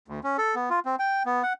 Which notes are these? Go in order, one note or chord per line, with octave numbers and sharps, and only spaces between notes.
D2
C#4
A4
B3
F4
C4
G5
B3
F#5